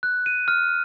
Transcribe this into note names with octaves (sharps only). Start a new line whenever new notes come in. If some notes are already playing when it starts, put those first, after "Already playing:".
F#6
D#7
F6